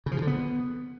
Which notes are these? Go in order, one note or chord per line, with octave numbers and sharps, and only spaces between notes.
C#3
F3
B2
D3
B3